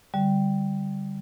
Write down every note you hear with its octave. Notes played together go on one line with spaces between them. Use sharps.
D3 G3